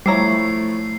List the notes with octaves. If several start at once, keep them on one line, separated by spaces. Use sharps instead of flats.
F3 G3 A3 E4 C#5 E5 A#5 C7